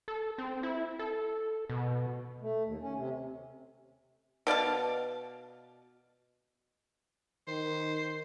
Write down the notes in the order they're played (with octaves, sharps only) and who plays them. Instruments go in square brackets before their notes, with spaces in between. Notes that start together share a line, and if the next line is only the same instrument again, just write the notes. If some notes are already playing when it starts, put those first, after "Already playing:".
[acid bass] A4
C4
E4
A4
B2
[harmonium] A3
D#2
C#4
C3
[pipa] B2 D5 F5 A5
[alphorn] D#3 [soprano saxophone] C5